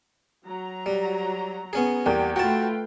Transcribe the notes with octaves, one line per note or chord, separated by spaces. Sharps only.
F#3 A#5
G3
B3 C#4 G#4
E2 G3 A#3 G5
A3 F4 F#4 B4 G5 A5